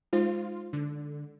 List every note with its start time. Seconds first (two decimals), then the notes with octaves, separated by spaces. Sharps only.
0.13 G#3 D#4 F4 C5
0.73 D3